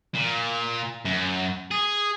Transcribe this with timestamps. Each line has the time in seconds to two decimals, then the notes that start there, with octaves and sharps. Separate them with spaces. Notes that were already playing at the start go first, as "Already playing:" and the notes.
0.15 A#2
1.05 F#2
1.71 G#4